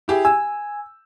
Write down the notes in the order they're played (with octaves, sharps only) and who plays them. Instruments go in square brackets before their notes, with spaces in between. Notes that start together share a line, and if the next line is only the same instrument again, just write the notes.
[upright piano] E4 G4 G#4
[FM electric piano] G#5 [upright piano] E6